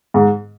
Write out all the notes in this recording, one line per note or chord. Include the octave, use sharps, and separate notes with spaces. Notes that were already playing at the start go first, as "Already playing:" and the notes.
G#2